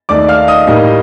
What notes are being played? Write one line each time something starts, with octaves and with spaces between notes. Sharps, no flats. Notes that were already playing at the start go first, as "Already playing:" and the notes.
D#2 D#3 A3 D#4 D5 D6
F5 F6
D#5 D#6
A2 G3 A#3 D#4